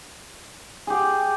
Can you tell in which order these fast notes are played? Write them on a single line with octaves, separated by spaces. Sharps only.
G#4 G4 F#5